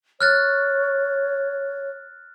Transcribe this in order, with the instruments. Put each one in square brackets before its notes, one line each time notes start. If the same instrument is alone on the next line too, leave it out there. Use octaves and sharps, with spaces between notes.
[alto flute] C#5 [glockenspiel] F6 F#6 A6